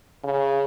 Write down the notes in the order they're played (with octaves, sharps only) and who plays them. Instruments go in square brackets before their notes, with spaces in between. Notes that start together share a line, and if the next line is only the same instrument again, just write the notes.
[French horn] C#3